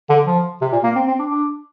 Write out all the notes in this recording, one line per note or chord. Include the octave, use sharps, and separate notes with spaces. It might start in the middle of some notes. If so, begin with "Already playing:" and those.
D3
F3
C3
A#2
A#3
C4
C4
D4
D4